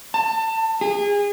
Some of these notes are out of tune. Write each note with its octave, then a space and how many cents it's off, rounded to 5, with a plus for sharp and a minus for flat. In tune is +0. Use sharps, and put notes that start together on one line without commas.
A5 +25
G#4 -30